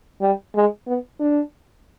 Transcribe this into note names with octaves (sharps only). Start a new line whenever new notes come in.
G3
G#3
B3
D4